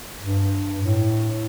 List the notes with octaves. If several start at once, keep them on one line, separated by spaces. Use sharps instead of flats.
G2
A2